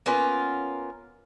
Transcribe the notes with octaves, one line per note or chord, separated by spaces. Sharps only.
A#3 B3 C#4 F4